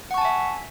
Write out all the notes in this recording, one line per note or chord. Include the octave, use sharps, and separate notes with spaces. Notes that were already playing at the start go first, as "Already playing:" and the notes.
E5 F#5 G#5 A5 C#6